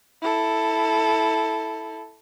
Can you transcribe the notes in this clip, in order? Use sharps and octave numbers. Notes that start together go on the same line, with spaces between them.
E4 A4